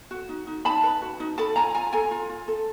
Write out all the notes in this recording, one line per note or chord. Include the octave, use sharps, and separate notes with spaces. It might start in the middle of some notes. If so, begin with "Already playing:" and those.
F#4
D#4
D#4
D#4 A5 B5
B4
F#4
D#4
A4 A5 B5
F4 G#5 A#5
F4 G#5 A#5
A4 G#5 A#5
F4
F4
A4